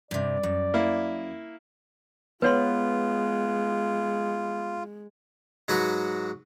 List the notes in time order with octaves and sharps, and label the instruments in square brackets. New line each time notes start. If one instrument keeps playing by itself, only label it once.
[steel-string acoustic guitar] G2 C3 [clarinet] D5
[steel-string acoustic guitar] F#2
[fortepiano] A#3 E4
[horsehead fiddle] G#3 [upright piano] B3 [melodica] F4 [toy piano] B4 C#5 C6
[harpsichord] G#2 F#3 F#4 B4